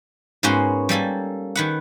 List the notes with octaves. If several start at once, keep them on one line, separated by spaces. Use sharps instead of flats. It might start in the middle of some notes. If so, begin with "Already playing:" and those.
G#2 A#3 B3 C#4 F#4 C6
G3 A#3 A4 G#5
D#3 B4 F#5